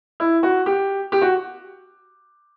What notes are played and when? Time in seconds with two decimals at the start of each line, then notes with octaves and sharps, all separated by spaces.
0.20 E4
0.43 F#4
0.66 G4
1.12 G4
1.22 F#4